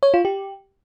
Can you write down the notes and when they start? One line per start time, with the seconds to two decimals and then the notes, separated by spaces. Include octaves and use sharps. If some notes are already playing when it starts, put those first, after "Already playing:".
0.03 C#5
0.14 F4
0.25 G4